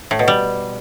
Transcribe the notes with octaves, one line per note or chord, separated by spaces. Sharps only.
A2
B2
G3